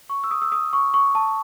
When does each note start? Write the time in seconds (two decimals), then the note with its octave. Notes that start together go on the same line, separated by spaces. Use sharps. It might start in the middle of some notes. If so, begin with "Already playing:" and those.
0.10 C#6
0.24 E6
0.31 D#6
0.42 E6
0.52 D#6
0.73 C#6
0.94 C#6
1.15 A5